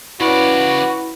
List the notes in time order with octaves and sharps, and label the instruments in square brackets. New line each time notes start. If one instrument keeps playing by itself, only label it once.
[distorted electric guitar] C#3 D5 [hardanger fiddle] C#4 B4 [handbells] E4 B5 [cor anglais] F#4